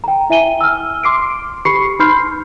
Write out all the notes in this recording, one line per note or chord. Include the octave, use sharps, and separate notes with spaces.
G5 A#5
E4 E5 G#5 D#7 G7
E6 F6
C6 D6 C7 D7
G4 B5 C#6 C7 C#7
D#4 B5 C6 F6 G6 C7